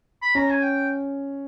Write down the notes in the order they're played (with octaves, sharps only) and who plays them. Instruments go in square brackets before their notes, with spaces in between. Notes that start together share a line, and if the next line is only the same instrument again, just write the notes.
[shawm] B5
[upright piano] C#4 [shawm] A#5
[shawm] G#5
G5